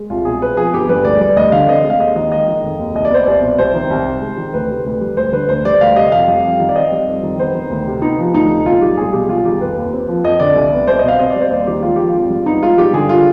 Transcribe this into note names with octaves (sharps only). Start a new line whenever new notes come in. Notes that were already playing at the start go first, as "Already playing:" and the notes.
Already playing: G#3
C2 F4
B2 G#4
C4 B4
F3 G#4
G1 G4
G2 B4
D2 D5
G3 D5
D2 D#5
D3 F5
D5
C4 D#5
G#3
F5
D#2 D#5
D#3 D#5
G#3 D#5
D#3
F1
D#2
C2 D#5
D5
B3 C5
C2 D5
B2
C2 C5
D#3
C2
C3
G#3
D#3
D2 B4
C3
D2
G3
D2 C5
D3 B4
D2 C5
G3 D5
D2 F5
C3 D#5
F2 F5
G3
F2
D#3
D5
C4 D#5
G3
F2
D#3
B3 C5
D#3
D2
C3
B3 D#4
F3
D2 D#4
C3
B1 F4
G3 G4
B1 G#4
B2 G4
G3 F4
D#3 G4
F1 B4
D#2
C4
F3
F2 D#5
D3 D5
C2
B3
C2 C5
D5
B2 D#5
F5
C4 D#5
D5
G3
C5
D#2 D5
D#3 G4
G#3 F4
F3 G4
F4
G#1
G2
B3 D#4
G#3 F4
G2 G4
D3 G#4
F4